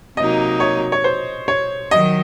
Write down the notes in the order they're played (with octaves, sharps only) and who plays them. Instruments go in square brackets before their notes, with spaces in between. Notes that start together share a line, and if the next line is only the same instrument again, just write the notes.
[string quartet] C3 F#3 A#3 D#4 [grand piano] D#5
[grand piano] C#5
C#5
C5
C#5
[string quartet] D#3 F#3 [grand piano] D#5